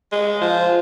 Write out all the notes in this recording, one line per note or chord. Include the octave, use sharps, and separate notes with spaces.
G#3
F3